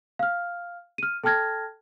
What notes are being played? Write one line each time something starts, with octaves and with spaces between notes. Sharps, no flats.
F5 F6
F6 D#7
A4 G5 A5 F6 G#6 A#6